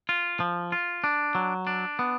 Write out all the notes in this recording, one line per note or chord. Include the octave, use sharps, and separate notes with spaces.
F4
F3
F4
D4
F#3
D4
B3